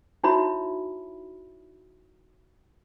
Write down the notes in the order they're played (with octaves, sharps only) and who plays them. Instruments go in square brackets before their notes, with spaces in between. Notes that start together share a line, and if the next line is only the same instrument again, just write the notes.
[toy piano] D#4 E4 F#4 C#5 E5 B5